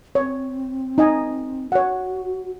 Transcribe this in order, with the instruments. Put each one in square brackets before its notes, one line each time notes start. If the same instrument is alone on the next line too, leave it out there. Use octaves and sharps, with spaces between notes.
[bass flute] C4 [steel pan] C#5
[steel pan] D#4 D#5 G#5
[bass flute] F#4 [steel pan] C#5 F#5